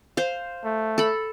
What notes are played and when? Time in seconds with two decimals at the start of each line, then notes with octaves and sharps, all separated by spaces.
0.17 C5 F5
0.64 A3
0.98 A4 B5